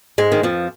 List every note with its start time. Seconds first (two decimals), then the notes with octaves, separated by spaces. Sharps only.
0.18 G#2 G#3
0.32 D#3
0.43 F2 F3